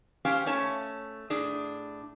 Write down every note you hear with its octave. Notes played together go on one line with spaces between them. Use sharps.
C#4 G4 C5 F5 G5
A3 C#4 C#5 A5
A2 D4 G#4